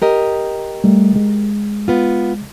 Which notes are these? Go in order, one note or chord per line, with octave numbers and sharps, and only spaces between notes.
G4 A#4 D#5
G3 A3
G#3
B3 F4